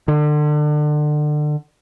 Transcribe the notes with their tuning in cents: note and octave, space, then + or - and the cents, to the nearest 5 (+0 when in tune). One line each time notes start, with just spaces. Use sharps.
D3 +30